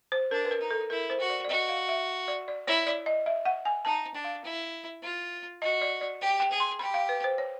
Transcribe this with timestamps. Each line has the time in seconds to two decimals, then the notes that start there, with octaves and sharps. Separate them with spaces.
0.12 C5
0.31 D4 A#4
0.45 B4
0.51 A#4
0.60 D#4
0.71 A4
0.90 E4 A#4
1.10 C5
1.20 F#4
1.30 D5
1.45 D5
1.49 F#4 D#5
1.69 F5
1.89 E5
2.28 D5
2.48 D5
2.67 E4 C#5
2.87 D5
3.06 D#5
3.26 E5
3.45 F#5
3.65 G#5
3.85 D#4 A5
4.14 D4
4.24 F5
4.44 E4
5.02 F4
5.62 F#4 D#5
5.81 D5
6.01 D5
6.21 G4
6.40 G5
6.51 G#4
6.60 C6
6.79 G4 B5
6.94 F5
7.09 B4
7.24 C5
7.38 C#5